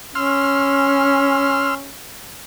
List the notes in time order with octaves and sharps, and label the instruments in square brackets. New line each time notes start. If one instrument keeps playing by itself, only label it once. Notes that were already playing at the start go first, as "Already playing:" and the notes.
[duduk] C#4 [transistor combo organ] C6 E6 F6